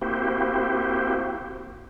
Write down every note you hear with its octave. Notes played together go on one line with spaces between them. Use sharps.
A#3 C4 E4 F#4 G4 C5